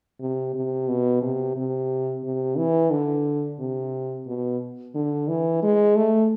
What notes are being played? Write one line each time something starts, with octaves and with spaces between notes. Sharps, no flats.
C3
C3
B2
C3
C3
C3
E3
D3
C3
B2
D3
E3
G#3
A3